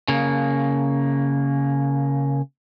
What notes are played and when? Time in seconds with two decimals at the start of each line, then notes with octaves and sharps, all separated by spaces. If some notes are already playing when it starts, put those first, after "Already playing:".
0.08 C#3 A#3